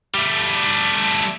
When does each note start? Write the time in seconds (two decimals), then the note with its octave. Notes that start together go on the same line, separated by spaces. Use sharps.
0.14 G3 A3